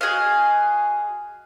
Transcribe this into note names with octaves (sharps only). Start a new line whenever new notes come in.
F#4 G#4 D#5 F5